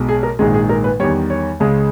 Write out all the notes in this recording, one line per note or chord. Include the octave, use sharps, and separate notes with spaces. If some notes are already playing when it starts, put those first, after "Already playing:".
Already playing: B1 B2 G#3
G#4
A#4
A#1 G#2 D#3 G#3 G#4
G#4
A#4
B4
E2 D#3 G3 C#5
C#5
C#2 C#3 G#3